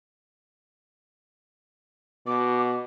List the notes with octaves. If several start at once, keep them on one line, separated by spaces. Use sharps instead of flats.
B2 D6